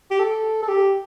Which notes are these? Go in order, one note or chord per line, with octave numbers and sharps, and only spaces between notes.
G4
A4
A4
G4